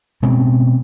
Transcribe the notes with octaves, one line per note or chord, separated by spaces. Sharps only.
B2 G#3 C4 C#4